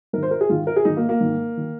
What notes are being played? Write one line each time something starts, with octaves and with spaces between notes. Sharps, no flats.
G#2 D#3 A#4
C5
A#4
G#4
G#2 D#3 F4
A#4
G#4
G#2 D#3 D#4
A#3
A#3
G#2 D#3
D#3